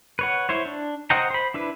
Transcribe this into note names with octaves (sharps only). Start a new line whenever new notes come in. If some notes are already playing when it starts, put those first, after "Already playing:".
B4 C#5 F#5
E4 C5 C#5
D4
C5 D#5 F#5 G5 A#5
C5 B5
D4 E4 B4